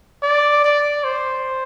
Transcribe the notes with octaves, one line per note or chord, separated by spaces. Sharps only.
D5
D5
C5